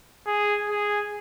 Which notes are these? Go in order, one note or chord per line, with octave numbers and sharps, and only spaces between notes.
G#4
G#4